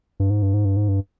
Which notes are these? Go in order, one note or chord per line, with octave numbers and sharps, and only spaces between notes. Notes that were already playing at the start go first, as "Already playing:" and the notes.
G2
G#2
G2
G#2
G2
G#2
G2